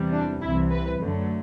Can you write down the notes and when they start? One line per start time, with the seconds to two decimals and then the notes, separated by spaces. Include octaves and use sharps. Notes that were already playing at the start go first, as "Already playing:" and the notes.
Already playing: E2 C3 E3 G3
0.13 D4
0.42 C2 C3 E3 E4
0.71 B4
0.99 F#2 D3 F#3 A3